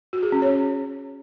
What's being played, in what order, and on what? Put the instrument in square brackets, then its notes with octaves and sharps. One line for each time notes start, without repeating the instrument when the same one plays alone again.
[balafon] F#4
G#4
C#4
C#5